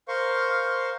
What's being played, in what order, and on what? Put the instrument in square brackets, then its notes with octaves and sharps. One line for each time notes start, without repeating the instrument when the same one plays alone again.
[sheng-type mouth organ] A#4 C5 F5 C#6